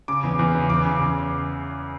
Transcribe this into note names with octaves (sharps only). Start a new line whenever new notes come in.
C#3 D6
E2
E2
C#3
E2 D6
C#3
E2